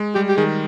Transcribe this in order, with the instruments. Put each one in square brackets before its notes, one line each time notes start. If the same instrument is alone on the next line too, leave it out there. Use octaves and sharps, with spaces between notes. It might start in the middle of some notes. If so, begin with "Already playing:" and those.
Already playing: [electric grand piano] G#3
[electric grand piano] G3 [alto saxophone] G4
[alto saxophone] G4
[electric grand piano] D#3 [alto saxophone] G#4